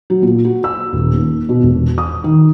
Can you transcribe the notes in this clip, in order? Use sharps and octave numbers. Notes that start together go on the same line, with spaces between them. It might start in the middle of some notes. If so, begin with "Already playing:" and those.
F#3
A#2
F#4
E6
D#1
D#2
B2
E1
D#6
D#3